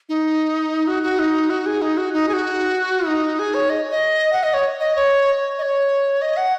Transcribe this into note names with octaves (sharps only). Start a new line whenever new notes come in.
D#4
F#4
F#4
D#4
F#4
G#4
D#4
F#4
D#4
G#4
F#4
D#4
G#4
C#5
D#5
D#5
F#5
D#5
C#5
D#5
C#5
D#5
C#5
D#5
F#5